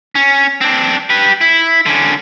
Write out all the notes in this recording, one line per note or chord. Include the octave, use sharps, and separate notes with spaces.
C#4
C4 D4
G4 B4
E4
D3 C#4